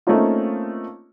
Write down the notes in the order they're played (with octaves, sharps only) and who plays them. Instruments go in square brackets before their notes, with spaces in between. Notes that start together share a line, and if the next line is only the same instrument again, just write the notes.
[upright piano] A3 A#3 C4 C#4 D#4 F4